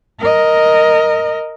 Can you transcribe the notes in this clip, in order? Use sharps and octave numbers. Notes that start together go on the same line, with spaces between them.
A#4 D#5